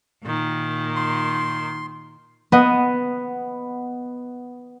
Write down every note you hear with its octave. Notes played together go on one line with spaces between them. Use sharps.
A#2 D#3
C6
B3 D#5